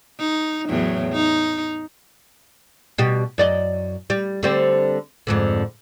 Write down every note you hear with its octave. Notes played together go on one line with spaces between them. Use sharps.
D#4
E2 A2 F#3
D#4
B2 G3 G4
F#2 D5 D#5
G3
D3 G3 C4
F2 G#2 D3